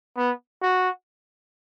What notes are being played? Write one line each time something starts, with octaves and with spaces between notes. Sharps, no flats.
B3
F#4